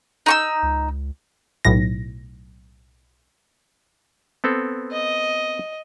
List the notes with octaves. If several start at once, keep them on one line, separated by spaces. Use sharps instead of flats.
D#4 C#6 E6
C#2
B1 A2 A#6
B3 C4 A4
D#5